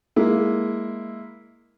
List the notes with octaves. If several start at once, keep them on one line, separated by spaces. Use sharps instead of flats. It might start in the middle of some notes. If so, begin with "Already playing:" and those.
G#3 A#3 E4